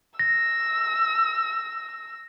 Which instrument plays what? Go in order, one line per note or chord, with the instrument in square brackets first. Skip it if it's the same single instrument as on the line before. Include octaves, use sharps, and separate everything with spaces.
[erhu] E6 [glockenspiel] A#6